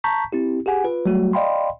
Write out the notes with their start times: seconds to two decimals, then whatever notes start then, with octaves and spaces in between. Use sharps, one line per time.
0.04 A5 A#5 C#6 G6 B6
0.33 C4 E4 G4
0.66 G4 G#4 F#5 G#5
0.84 F4 B4
1.06 F#3 G3 A3 F#4
1.33 D5 D#5 F5 G5 B5 C6